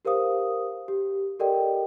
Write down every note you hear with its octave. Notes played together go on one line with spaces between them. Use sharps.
G4 A#4 C5 F5 D#6
G4
G4 A4 A#4 D5 D#5 G5